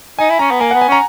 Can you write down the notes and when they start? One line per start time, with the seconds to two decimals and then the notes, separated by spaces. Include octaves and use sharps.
0.19 D#4 G#5
0.30 E4
0.39 C#4 A#5
0.51 B3
0.60 A#3 G#5
0.71 F#5
0.74 B3
0.81 G#5
0.88 C#4 A#5